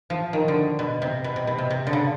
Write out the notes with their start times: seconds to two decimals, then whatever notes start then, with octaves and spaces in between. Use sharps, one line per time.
0.10 F3
0.33 D#3
0.48 D3
0.79 B2
1.02 C3
1.24 B2
1.36 C3
1.47 B2
1.58 C3
1.70 C3
1.87 D3
1.93 C#3